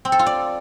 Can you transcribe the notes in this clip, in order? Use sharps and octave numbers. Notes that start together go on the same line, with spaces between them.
C4
A4
F4
D5